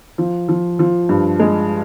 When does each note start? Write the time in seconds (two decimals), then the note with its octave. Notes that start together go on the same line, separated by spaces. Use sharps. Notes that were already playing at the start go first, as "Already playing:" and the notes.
0.18 F3
0.49 F3
0.79 F3
1.09 G2
1.40 G#3